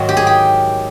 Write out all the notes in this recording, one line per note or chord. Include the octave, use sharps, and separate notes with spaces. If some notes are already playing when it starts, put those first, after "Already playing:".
Already playing: G#2 D#3 F#3
G4
G#4
G4